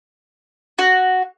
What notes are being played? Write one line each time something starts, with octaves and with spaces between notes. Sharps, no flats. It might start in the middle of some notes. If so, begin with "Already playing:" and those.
F#4